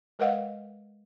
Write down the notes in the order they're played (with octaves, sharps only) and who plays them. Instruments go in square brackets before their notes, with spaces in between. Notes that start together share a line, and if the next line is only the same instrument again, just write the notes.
[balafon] G#3 A#4 B4 D#5 F5 F#5